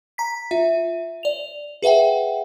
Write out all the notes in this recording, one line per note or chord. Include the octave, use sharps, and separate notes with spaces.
A#5 B6
F4 E5
D5 F7
G#4 B4 E5 F#5 G5